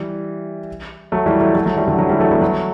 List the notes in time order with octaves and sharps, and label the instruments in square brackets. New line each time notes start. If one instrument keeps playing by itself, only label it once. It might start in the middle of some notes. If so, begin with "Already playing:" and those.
Already playing: [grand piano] E3 G3
F#3 A3
E3 G3
F#3 A3
F#3 A3
F#3 A3
E3 G3
D3 F#3
D3 F#3
E3 G3
F#3 A3
G3 B3
F#3 A3